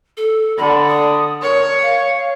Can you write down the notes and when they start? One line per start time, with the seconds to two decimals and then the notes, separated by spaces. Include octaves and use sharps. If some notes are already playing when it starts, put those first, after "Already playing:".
0.17 A4
0.57 D3 B5
0.88 D#6
1.42 A#4 C#5
1.83 F5